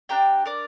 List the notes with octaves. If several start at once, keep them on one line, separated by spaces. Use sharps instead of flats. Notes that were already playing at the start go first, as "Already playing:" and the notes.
D4 G4 G5 A#5
A#4 D5